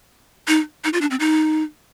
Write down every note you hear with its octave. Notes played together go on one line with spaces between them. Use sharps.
D#4
D#4
F4
D4
C4
D#4